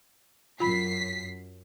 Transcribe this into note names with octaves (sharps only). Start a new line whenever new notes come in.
F#2 F4 B5 B6 C7